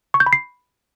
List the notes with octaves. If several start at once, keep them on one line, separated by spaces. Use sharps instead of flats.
C#6
G6
B5
C7